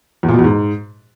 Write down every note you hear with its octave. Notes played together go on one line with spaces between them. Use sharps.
E2
A#2
B2
E2
G#2